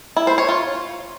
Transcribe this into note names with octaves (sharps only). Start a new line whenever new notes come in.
E4
C5
C#5
F4